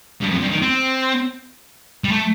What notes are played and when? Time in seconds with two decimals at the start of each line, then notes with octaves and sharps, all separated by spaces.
0.21 G2
0.30 F2
0.41 G2
0.52 D#3
0.62 C4
2.04 G3
2.12 A3